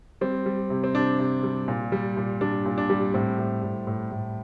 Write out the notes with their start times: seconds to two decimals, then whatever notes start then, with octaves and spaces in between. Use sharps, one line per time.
0.21 G3 C4
0.46 G3
0.70 C3
0.84 C4
0.95 C3 D4
1.18 C3
1.43 G3
1.68 A#2
1.92 G3
2.17 A#2
2.41 G3 D4
2.65 A#2
2.78 D4
2.90 G3
3.14 A2 C4
3.39 A2
3.63 A2
3.87 A2
4.11 A2